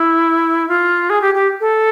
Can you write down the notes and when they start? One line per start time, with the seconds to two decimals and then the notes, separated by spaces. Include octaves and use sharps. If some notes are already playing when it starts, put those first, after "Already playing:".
Already playing: E4
0.69 F4
1.10 G#4
1.22 G4
1.34 G4
1.60 A4